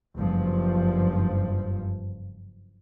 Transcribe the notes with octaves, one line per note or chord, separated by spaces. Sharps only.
F#1 G2 F3